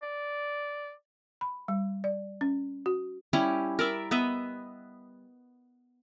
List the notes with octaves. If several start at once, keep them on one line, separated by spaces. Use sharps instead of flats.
D5
B5
G3
D5
C#4
F#4
G3 C#4 E4 G4
A#4 D5 E5
B3 D#5 E5